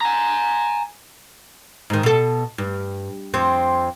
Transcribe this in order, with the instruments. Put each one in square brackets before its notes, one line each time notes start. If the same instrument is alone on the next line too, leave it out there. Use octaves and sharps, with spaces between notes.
[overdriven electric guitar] G#5 A#5
[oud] G#2 D#3
B2 A4
G2
F2 C4